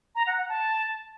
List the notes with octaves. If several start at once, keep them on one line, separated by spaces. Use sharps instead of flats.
A#5
F#5
F#5
A5